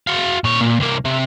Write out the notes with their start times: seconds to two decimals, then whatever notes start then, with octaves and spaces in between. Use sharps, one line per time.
0.07 F#4 F5
0.44 A#2 C#5
0.61 A#2
0.80 C2 A#3
1.05 C3